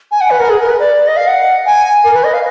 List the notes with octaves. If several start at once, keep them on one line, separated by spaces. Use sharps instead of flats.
G#5
F#5
B4
A#4
G#4
A#4
B4
D5
D#5
F5
F#5
G#5
A#4
B4
D#5
F5